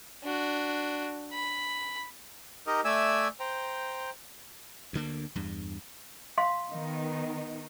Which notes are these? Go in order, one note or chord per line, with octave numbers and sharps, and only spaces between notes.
D4 F#4
B5
D#4 G4 A#4 D#5
A3 D5 E5 G#5 E6
C5 G5 A#5
D2 D3 A#3
E2 G2
F5 C6
D#3 B3 D#4